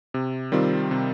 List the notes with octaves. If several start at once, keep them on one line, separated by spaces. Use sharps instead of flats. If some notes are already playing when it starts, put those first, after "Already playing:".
C3
D#3 G3 C4 F4
C3